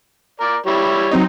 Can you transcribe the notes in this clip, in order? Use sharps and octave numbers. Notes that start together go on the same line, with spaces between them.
A#4 D5
G3 E4 C#5
F#3 C4 D#4